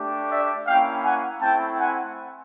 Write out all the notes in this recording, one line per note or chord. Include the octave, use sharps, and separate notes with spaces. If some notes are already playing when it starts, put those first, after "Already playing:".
Already playing: A3 D4 G4
D5 E5
A#3 C#4 E4 F5 G5
F#5 G#5
A3 C4 E4 G5 A5
F#5 G#5